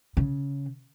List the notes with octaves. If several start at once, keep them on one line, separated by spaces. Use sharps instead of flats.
C#3